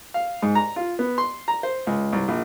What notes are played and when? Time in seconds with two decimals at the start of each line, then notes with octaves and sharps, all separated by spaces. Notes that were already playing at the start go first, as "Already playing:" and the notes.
0.14 F5
0.42 G#2
0.55 A#5
0.76 F4
0.99 B3
1.18 C6
1.48 A#5
1.63 C5
1.87 C#2
2.13 C2
2.28 A#1